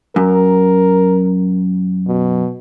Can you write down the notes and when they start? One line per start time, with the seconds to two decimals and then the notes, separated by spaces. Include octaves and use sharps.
0.16 F#2 A#4
2.07 B2